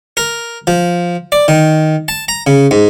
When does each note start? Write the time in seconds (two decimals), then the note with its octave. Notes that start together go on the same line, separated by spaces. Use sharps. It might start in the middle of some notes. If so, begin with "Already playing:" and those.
0.17 A#4
0.67 F3
1.32 D5
1.48 D#3
2.08 A5
2.28 A#5
2.47 C#3
2.71 G#2